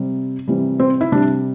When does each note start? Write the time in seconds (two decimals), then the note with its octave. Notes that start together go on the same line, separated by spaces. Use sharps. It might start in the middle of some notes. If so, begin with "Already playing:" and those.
Already playing: C3 G3
0.48 C3 E3 G3
0.80 C4
1.01 E4
1.12 C3 G3 D4